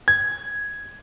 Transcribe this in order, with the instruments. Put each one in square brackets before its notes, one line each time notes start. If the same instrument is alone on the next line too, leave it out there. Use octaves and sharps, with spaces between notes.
[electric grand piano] G#6